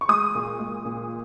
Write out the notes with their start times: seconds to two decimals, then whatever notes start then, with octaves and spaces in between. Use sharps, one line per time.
0.01 C#6
0.09 G#3 D#6
0.35 A#2
0.59 G#3
0.85 A#2